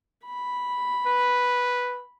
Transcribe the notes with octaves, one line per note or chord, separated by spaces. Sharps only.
B5
B4